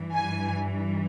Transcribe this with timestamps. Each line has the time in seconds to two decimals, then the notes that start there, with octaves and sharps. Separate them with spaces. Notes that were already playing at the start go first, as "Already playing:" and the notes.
Already playing: G2 E3
0.14 G#5